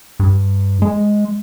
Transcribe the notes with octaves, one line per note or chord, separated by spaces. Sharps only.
G2
G#3